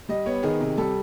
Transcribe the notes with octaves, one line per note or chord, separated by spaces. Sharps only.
G3 D#5
B3 C#5
D#3 G#4
C3
G3 A4